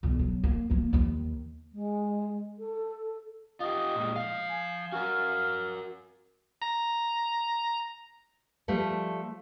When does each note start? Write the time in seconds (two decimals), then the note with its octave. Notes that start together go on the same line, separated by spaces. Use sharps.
0.03 B1 D3
0.19 F#3
0.44 A#3
0.70 F3 A#3
0.93 D#2 D#3
1.73 G#3
2.59 A4
3.60 F4 G4 D#5
3.96 A#2 G#3
4.16 F3 F5
4.49 G#5
4.92 F#4 A#4 F5
6.62 A#5
8.68 F3 G3 A3